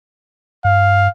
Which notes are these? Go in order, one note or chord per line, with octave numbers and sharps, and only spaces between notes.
G2 F5